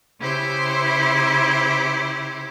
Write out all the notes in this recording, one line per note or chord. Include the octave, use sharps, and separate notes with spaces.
C#3 E4 G4 C5